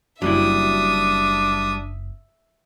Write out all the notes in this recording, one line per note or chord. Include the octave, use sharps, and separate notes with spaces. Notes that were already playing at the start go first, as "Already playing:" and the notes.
F#1 F#3 G3 D4 E4 E5 D#6